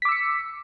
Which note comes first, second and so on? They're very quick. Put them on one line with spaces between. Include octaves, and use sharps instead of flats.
B6 D6 E6 C#7